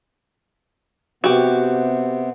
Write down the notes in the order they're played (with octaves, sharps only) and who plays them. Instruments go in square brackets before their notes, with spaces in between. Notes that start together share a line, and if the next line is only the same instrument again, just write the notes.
[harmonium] C3 B3 [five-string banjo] F#4 G4